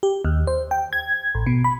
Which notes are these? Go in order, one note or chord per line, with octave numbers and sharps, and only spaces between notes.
G4
D#2
C5
G5
G#6
A1
B2
B5